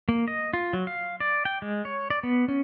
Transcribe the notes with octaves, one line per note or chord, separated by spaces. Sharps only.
A#3
D#5
F4
F#3
F5
D5
G5
G#3
C#5
D5
B3
C#4